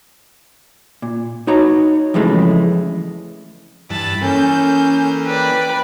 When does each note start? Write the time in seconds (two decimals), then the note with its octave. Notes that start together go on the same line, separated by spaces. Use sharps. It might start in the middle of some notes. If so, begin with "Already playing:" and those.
1.02 A#2
1.47 D#4 F#4 C#5 A#5
2.14 F2 C#3 E3 G#3 A3
3.90 G2 E3 A5 B5 A6
4.22 E3 A#3 C#4 A4 G6
5.25 B4 D5 G5